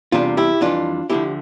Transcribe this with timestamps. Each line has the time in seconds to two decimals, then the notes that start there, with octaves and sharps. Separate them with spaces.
0.12 E2 C3 G3 D4 F4
0.37 E4 G4
0.61 F2 E3 G3 D4 F4
1.10 D2 D3 F3 A3 E4 G4